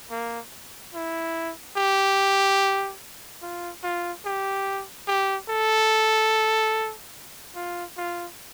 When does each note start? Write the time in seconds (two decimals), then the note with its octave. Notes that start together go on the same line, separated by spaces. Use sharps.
0.11 A#3
0.94 E4
1.77 G4
3.42 F4
3.83 F4
4.25 G4
5.08 G4
5.49 A4
7.55 F4
7.97 F4